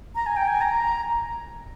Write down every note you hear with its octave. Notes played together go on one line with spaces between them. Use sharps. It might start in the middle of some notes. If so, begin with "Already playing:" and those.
A#5
G#5
G5
G#5
A#5